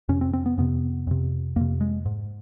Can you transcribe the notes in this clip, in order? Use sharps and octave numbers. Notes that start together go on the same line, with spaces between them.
F2 C3 C#4
C4
C4
B3
F2 C3 B3
F2 C3
F2 C3 A#3
G#3
G#2